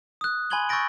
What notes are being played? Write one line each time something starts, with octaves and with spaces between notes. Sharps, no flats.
D#6 F#6
G#5 B5 C6 G#6 F#7 G7
C#6 E6 G6 A6 A#6 D7